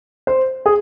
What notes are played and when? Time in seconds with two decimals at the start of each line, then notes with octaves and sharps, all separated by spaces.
0.27 C5
0.66 G#4